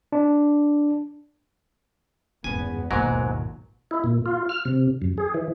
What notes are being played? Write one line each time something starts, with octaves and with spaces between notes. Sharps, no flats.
D4
G#1 E2 G2 C#3 B3 G#5
G#1 D#2 G#2 B2 F#3 F4 A#4
E4
A#2
F4
F6
C3
F#2
G#4
E3